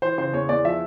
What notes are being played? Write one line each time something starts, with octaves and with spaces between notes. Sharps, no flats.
E3 C5
C#3 C5
E2 C#5
E2 D5
F3 E5